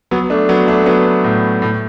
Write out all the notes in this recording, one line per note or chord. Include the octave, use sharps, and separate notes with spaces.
F#3 B3
A3 D4
F#3 B3
A3 D4
F#3 B3
A2
A2